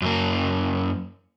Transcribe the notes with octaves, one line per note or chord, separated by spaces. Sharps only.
F#2 A#3